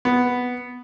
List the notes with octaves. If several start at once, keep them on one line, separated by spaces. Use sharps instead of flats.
B3